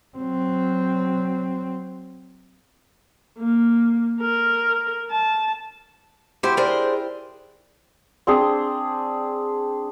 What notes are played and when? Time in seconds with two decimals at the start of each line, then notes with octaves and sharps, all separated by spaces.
0.18 F#3 C4
3.39 A#3
4.21 A#4
5.11 A5
6.43 E4 F#4 G4 C5
6.57 D4 G#4 A#4 C5
8.27 C4 D4 G#4